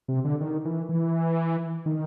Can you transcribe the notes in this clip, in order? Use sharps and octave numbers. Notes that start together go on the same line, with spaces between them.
C3
D3
D#3
E3
E3
D#3